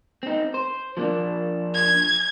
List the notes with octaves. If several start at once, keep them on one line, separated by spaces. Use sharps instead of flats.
C4 D#4
C5
F3 A#3 D4
G#6